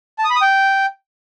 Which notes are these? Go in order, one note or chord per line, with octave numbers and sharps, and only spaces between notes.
A5
D#6
B5
D#6
G5